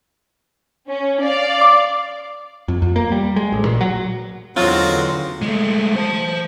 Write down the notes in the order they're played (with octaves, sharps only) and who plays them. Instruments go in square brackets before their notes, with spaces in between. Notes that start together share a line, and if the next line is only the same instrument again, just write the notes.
[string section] C#4
D5 F5
[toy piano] D6
[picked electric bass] F2
F2
A#3
G3
G#3
A1
A#2
F#3
[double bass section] E2 D3 C#4 [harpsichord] F#3 [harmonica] G#3 C4 F#4 [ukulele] F4
[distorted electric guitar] G#3 A3
C5 A5